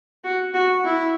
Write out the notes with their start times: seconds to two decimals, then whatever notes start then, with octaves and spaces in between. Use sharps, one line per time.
0.24 F#4
0.54 F#4
0.84 E4